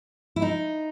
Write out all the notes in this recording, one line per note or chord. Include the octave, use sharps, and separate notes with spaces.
E4
D#4